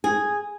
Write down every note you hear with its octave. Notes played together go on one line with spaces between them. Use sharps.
G#4